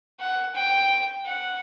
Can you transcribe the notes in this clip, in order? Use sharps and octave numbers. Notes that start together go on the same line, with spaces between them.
F#5
G5
F#5